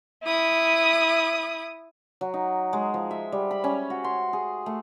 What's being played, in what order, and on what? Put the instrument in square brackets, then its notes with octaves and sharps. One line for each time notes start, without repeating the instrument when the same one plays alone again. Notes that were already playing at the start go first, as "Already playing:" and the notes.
[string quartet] E4 D#6
[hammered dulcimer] F#3
D#4
G#3
F3
E5
G3
B5
C#4
F#4
C6
G#4
A3